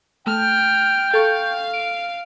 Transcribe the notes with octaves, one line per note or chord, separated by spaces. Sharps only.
A3 G5 F6
A4 F5 C#6
D7